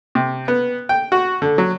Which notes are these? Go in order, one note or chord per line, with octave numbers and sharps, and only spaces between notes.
C3
B3
G5
F#4
D3
F#3